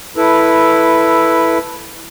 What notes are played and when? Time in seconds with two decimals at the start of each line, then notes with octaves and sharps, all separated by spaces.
0.17 E4 A4 B4